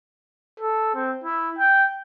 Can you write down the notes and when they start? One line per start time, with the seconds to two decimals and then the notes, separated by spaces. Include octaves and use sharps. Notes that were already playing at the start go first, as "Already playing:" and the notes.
0.60 A4
0.95 C4
1.24 E4
1.58 G5